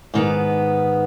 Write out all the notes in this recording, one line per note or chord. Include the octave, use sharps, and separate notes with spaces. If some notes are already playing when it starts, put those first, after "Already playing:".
G#2 D#3 B3